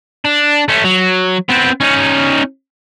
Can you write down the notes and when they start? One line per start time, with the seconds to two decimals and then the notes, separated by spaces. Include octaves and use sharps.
0.25 D4
0.68 A3 C#4
0.84 F#3
1.49 B3 C4
1.81 C#4 D#4